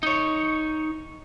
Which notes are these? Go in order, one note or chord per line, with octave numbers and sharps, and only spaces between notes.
D#4 C#5